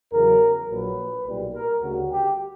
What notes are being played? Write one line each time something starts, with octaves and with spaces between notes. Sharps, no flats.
E2 C#3 F#3 A#4
A#1 A#2 F#3 B4
B1 A#2 G3
A#4
D2 C#3 G3 F#4
G4